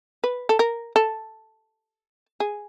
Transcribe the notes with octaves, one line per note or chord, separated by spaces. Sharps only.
B4
A4
A#4
A4
G#4